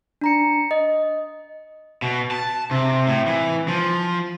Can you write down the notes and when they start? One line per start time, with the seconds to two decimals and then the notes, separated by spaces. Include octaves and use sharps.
0.21 D4 A#5 C#7
0.71 D#5
2.02 B2
2.31 A5
2.71 C3
3.07 A2
3.26 E3
3.68 F3